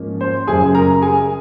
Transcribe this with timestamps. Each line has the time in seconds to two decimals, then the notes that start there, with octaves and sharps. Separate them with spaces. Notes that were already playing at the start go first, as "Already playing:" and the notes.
Already playing: G#2 F3 A#3 C#4
0.21 C5
0.47 F#1 F#2 C#3 F#3 G#4 G#5
0.75 A#4 A#5
1.02 G#4 G#5